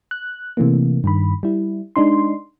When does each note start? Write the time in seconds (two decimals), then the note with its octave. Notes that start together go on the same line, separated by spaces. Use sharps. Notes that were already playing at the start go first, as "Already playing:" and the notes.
0.11 F#6
0.57 C3 E3 A3 A#3
1.04 G2 D#3 B5
1.43 G3 E4
1.96 G#3 D4 D#4 C6